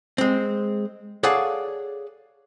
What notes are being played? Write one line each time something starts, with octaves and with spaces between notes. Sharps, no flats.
G#3 C4
G#4 A4 C#5 D5 F5 F#5